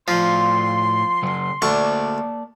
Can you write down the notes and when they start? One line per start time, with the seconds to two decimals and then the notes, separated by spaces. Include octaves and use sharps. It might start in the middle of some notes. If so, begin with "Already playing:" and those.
0.08 A2 F3 F5 C6
1.22 C#3 F#3
1.62 D2 A#3 D5 A5 C#6